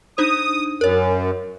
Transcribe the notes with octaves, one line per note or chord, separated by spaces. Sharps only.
D4 D#4 C5 D#6
F#2 A#4 C#5